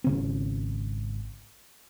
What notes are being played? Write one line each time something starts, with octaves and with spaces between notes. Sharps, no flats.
G#1 C#3 C4